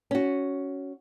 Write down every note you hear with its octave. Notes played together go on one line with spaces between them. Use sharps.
C#4 F#4